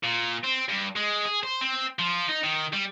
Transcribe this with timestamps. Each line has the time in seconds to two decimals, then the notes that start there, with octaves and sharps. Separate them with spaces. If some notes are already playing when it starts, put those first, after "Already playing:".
0.03 A#2
0.43 C4
0.68 G2
0.96 G#3
1.25 G#4
1.43 C5
1.61 C4
1.99 F3
2.29 D#4
2.44 D#3
2.73 G3